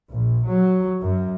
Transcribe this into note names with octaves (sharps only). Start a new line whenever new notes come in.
A#1
F#3
F#2